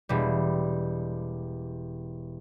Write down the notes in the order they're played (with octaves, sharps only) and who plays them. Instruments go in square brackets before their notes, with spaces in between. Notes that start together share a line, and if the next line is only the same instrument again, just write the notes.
[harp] E1 G3